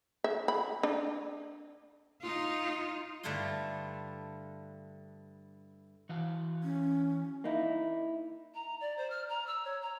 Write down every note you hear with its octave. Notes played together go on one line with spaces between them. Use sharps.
E5
B5
D4
D#4 F4
G2 D3 A3 E4 F4 C6
E3 F#4 F5
C#4
A#3 D#4 E4
A#5
D5
C5
F6
A#5
E6
C#5
A#5